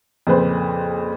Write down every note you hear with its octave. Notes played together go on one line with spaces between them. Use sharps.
F2 A#2 C#3 B4 C5